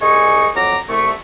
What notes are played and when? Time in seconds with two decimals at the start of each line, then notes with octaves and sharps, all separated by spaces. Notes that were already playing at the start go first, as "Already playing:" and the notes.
0.01 C2 G#3 D#4 G#5 C#6
0.55 F2 F#3 A#5 D6
0.89 C2 A3 C#6